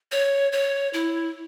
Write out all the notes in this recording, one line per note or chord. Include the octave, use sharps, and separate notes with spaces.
C#5
C#5
E4